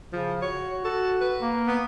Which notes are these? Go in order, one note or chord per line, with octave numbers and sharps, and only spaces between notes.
C#3 F3
F#4 C#5
F#4 A4
B4
A#3
B3